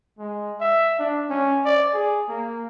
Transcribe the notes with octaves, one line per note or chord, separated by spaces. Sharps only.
G#3
E5
D4
C#4
D5
G#4
A#3